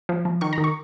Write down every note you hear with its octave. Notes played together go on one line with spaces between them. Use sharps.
F3
F3
D#3 C#6
A#5
D#3
C#6